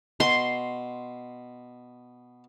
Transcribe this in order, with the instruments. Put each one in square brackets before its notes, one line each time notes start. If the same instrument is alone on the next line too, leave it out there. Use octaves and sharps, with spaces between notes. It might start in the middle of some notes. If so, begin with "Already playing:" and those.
[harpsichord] B2 [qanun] C6